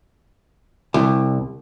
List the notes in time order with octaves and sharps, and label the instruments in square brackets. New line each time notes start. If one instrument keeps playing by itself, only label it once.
[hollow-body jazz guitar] C2